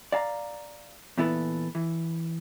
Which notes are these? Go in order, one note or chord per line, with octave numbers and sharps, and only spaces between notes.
D5 F5 A5 A#5
A#2 E3 B3 E4 A4 B4
E3